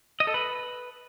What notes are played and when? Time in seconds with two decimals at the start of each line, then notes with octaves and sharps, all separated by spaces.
0.20 D#5
0.27 A4
0.34 B4